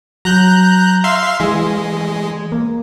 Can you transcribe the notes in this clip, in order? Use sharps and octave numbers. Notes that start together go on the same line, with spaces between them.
F#3 A#5 F#6 G6
E5 F5 C6
E3 G#3
A#3